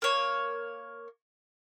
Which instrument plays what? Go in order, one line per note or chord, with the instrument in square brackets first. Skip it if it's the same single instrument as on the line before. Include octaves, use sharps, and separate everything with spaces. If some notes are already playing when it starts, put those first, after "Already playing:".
[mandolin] A#3 C#5